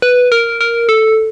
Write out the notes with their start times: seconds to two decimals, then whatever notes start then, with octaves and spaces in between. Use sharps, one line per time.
0.02 B4
0.32 A#4
0.61 A#4
0.89 A4